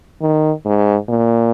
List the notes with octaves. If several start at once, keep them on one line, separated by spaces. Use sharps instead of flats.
D#3
G#2
A#2